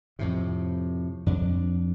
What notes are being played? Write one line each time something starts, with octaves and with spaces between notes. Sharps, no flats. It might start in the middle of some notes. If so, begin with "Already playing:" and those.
F2 A2 C3
F2 D4